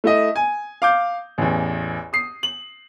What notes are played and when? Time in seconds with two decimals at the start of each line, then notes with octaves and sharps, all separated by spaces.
0.04 A3 E4 D#5
0.36 G#5
0.82 F5 D6 G6
1.38 A1 E2
2.13 D#6 C7
2.43 F#7